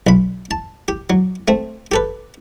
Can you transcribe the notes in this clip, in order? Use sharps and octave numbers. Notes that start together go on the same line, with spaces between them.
B1 B5
A5
G4
F#3
A3 C4
G4 A4 B4